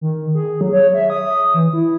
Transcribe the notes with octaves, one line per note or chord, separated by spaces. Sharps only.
D#3
G#4
F#3
C#5
E5
D#6
E3
E4